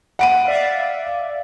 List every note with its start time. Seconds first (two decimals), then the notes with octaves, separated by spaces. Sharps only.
0.19 F#5 D7 D#7
0.45 D5 E5 F5